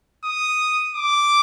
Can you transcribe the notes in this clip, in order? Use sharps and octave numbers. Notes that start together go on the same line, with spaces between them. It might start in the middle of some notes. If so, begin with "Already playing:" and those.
D#6
D6